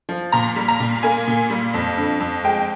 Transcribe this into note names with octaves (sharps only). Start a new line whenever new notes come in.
F3
A#2 A#5
G3
A#5
A#2
A#3 G#5
A#2
G3
F2
D3
F2
G#3 G5